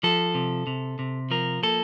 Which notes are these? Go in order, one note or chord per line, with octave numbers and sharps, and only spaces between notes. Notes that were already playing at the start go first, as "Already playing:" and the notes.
F3 A4
C3
C3
C3
F3 A#4
A#3 A4